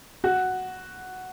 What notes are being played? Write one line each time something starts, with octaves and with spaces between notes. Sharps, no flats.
F#4